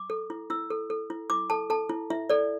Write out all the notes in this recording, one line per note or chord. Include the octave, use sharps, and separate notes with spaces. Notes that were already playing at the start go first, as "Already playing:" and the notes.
Already playing: D6
A4
E4
E4 E6
A4
A4
E4
E4 D6
A4 A5
A4 A5
E4
E4 E5
A4 D5